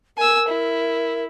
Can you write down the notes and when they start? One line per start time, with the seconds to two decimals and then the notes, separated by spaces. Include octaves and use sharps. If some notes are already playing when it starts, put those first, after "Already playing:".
0.18 A#4 G#5 E6
0.48 E4